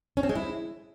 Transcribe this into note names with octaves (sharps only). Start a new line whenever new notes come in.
C#4
C4
G#3
E4